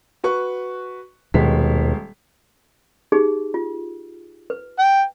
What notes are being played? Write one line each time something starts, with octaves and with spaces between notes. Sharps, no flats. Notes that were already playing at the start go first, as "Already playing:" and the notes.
F#4 B4 C#6
D#1 D#2 B2 G#3 B6
D#4 G4 G#4
F4
B4
G5